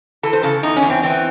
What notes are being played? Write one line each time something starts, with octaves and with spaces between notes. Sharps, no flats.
E3 A4
C5
C#3 A4
E2 D#4
C#4
E2
C4
E3 C4